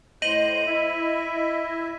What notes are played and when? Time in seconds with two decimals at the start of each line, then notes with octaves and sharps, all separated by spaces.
0.22 A2 C5 D#5 G6 D#7 F#7
0.66 E4 E5